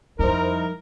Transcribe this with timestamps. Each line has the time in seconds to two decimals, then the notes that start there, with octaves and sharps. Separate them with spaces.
0.19 F2 F3 G3 D#4 E4 A#4 C5